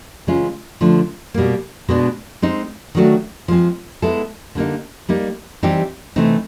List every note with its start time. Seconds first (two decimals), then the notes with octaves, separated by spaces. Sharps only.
0.27 C#3 E3 G#3 C#4 F4
0.81 D3 F3 A3 D4
1.34 B2 G3 A#3
1.89 B2 G#3 B3 D4
2.42 G#3 C4 D#4
2.95 D#3 F#3 A3 D4 F#4
3.48 F3 G#3 C4
4.02 G#3 B3 E4 A4
4.55 D3 G3 A#3 D#4
5.09 G3 A#3 D#4
5.63 E3 G3 C4 D#4 G4
6.16 C3 E3 A3 C4 D#4